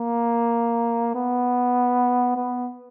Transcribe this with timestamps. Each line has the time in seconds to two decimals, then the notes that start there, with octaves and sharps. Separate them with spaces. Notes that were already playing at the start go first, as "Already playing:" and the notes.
Already playing: A#3
1.15 B3
2.36 B3